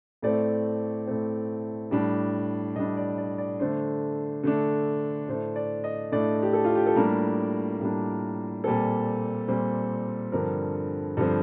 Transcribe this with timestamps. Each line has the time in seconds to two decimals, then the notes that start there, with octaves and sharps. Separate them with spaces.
0.22 A2 A3 C4 D5
1.07 A2 A3 C4
1.91 A2 G3 D4
2.76 A2 G3 D4 D#5
2.97 D5
3.18 D5
3.38 D5
3.59 D3 A3 D4 C5
4.43 D3 A3 D4
5.28 A2 A3 D4 C5
5.56 D5
5.84 D#5
6.12 A2 A3 D4 D5
6.43 G4
6.53 A4
6.64 F4
6.75 G4
6.86 A4
6.96 A2 G3 A#3 D4 A#4
7.80 A2 G3 A#3 D4
8.64 A#2 G3 C4 A4
9.48 A#2 G3 C4
10.32 G2 D3 F3 C4 A#4
11.17 G2 D3 F3 C4